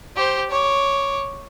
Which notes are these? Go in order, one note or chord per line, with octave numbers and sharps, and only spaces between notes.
G4 C5
C#5 D6